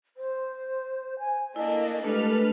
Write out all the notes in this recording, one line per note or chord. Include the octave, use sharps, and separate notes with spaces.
C5
G#5
A3 A#3 D4 E4 D#5
G#3 A3 D4 G4 A4 B4 F6